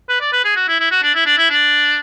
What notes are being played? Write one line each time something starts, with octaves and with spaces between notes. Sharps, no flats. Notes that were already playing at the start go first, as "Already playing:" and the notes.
B4
D5
B4
G#4
F#4
E4
E4
F#4
D4
E4
D4
E4
D4